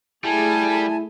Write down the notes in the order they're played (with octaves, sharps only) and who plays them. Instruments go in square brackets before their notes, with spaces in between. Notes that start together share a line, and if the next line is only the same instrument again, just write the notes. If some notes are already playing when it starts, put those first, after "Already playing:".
[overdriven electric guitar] G3 [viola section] A3 G#4 [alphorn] E4 [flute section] G#5 A5